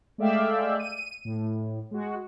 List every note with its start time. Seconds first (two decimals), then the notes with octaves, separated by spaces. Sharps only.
0.18 G#3 A3 D5 E5 F5 G5
0.79 D#7
1.25 A2
1.91 G#3 F#4